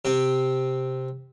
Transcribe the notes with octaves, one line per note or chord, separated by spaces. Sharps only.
C3 C4